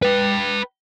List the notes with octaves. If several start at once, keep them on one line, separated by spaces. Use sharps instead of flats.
B4 G5